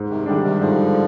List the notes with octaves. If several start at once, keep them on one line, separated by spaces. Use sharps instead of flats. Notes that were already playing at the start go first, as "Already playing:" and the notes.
Already playing: G#2
C3 D#3
D3 D#3 G3 D4
C3 D#3
G#2 D3 F3